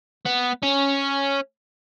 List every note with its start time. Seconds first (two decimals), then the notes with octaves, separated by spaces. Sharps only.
0.26 B3
0.63 C#4